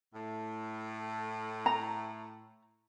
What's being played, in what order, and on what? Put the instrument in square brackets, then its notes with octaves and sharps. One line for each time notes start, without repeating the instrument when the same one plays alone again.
[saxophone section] A2
[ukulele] A#5